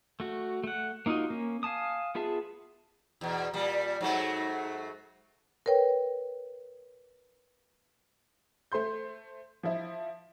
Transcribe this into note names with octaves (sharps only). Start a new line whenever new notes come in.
A3 F#4
A3 F#5
A#3 D#4 F4 F#4 D#5
A#3 C#4
F5 G#5 A5 D#6
B3 F4 G#4 E5 A5
E2 B2
A#2 G3
G#2 F#3 A3
A#4 B4 C#5 G5
A3 C5 C6 G6
F3 E4